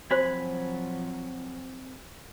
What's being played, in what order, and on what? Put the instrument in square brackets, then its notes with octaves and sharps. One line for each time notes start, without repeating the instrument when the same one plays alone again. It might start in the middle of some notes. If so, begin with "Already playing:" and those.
[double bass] F3 F#3 [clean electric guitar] C4 G#5 B5 [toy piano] F#4 C5